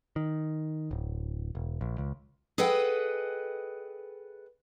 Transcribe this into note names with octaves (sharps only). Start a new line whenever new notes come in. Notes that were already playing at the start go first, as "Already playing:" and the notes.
D#3
D1
E1
A#1
C#2
G#4 A4 B4 D#5 F#5 G5